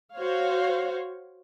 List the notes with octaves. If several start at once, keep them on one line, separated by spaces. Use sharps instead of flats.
F#4 C5 C#5 F5